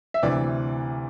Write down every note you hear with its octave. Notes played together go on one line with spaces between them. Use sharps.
E5
D2 C3 E3 D5